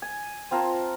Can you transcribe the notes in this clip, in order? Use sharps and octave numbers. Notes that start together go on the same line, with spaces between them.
G#5
C4 F4 A#4 A5